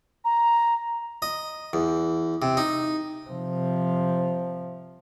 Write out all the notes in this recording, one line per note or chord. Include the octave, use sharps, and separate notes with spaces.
A#5
D#5
E2
C3
D#4
C3 F3